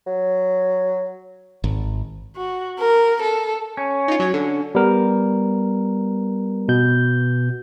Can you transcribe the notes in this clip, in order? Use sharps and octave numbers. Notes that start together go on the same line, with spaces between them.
F#3
G#1
F#4
A#4
A4
C#4
D#4 F4
F#3 C#5
D3
G3 B3 A#4
B2 G6